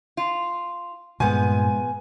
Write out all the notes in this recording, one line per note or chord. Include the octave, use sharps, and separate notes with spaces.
F4
G2 A#2 F3 G#3 B3 G#5